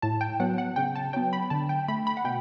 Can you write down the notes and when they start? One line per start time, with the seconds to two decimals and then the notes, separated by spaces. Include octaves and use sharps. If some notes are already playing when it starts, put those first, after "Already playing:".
0.02 A2 A5
0.21 G5
0.40 F#3 B3 F#5
0.58 F#5
0.76 C#3 G5
0.95 A5
1.13 F#3 B3 G5
1.33 B5
1.50 D3 A5
1.69 G5
1.88 A3 B5
2.07 B5
2.17 F#5
2.24 B2 G5